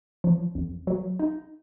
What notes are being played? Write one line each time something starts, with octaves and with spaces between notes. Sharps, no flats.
F3
F2
F#3
D#4